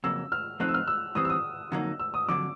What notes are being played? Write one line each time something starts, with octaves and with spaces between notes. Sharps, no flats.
F2 C#3 F#3 A#3 E6
F6
F3 A3 C4 D#4 F#6
E6
F6
E6
G2 E3 G3 C4 D#6
E6
D#6
F2 D3 F#3 A#3 D#4
E6
D#6
F2 D3 F#3 D6